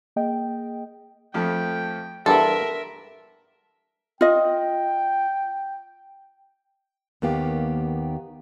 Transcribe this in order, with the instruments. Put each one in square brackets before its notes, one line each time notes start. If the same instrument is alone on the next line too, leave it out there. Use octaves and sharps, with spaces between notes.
[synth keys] A#3 G#4 D#5 G5
[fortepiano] F2 F3 A3 [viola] G5
[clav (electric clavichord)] E2 G2 [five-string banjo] A4 [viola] A#4 E5 [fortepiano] F#5 C6
[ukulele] F4 D#5 [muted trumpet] G5
[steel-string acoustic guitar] D#2 D#3 A#3 B3 G4 F5